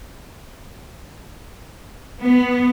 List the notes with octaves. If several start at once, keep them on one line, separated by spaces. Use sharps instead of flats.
B3